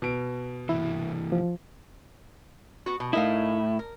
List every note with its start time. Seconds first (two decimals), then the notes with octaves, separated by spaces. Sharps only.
0.02 B2 D7
0.69 C2 E3 E4
1.32 F3
2.86 B3 F#4
3.00 B2
3.13 A2 D#4 E4 A#4 F5
3.79 A#4